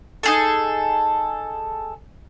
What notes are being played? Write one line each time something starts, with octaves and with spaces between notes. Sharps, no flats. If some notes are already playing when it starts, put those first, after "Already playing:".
D#4 G#4 A4